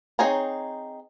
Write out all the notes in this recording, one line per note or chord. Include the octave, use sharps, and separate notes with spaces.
C4 D#4 G#4 C#5 A#5